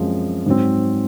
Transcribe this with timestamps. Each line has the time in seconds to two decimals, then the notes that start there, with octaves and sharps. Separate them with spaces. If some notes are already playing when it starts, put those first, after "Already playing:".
Already playing: F#2 F3 G#3 C4
0.46 G#2 F#3 C4